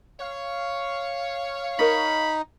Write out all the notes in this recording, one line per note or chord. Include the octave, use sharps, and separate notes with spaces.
C#5 F5
D#4 A#4 D#5 B5